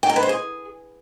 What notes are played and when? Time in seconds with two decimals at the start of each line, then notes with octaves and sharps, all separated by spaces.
0.03 G5
0.09 A#4
0.16 B4
0.23 C5
0.29 G#4